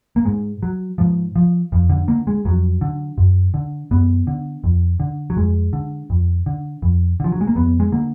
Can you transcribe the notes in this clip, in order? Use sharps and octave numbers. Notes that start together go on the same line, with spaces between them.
A#3
G#2 G#3
F#3
G#2 F3
F3
F2 F3
D3
D3 A#3
G#3
F2 F#3
D3
F#2
D3
F#2 B3
D3
F2
D3
F#3
F2 G#3
D3
F2
D3
F2
D3 F3
F#3
G#3
A#3
F2 B3
G#3
D3 A#3